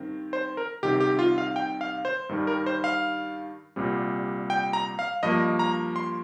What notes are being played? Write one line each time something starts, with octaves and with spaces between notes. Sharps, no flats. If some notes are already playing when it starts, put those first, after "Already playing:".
Already playing: G2 D#3 C4
C5
A#4
C2 C3 D#3 C4 G4
G4
F4
F5
G5
F5
C5
G2 D#3 G3
A#4
C5
F5
C2 A#2 G3 C4
G5
A#5
F5
G2 F3 A#3 D#5
A#5
C6